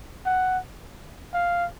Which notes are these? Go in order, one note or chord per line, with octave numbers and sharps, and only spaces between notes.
F#5
F5